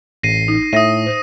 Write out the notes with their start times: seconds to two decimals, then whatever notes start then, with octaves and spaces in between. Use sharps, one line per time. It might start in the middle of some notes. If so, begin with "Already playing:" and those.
0.23 A1 A#6 C7 D#7
0.48 D#4
0.73 A2 E5 D#6 A#6 D#7
1.06 C5